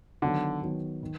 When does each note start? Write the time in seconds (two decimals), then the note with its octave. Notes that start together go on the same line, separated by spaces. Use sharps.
0.22 D3 D#3 F#3 B3
0.62 D#3 F#3 B3
1.03 D#3